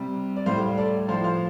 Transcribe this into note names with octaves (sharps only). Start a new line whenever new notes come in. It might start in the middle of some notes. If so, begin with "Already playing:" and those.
Already playing: C3 G3
D5
A2 G3 C5 F5
A4 D5
A2 F3 C5 F5
C5 F5